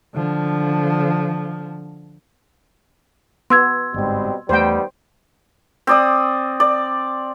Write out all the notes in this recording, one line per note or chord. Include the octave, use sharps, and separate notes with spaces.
D3 F3
B3 C6 E6 G#6
G1 G#2 B2 G3 C4
E2 D#3 G3 A3 B3 C5 G5
C4 D5 D#6
D5